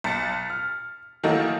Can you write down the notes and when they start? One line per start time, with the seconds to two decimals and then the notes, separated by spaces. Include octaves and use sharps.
0.04 B1 A6 C#7
0.50 F6
1.24 D#3 E3 F#3 A3 A#3 D#4